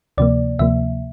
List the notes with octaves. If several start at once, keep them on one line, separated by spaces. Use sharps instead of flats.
D2 C3 F3 A#3 D5
D2 C3 F3 A#3 E5